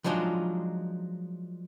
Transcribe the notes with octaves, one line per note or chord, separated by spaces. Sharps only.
F3 F#3 G#3 D4 D#4 F4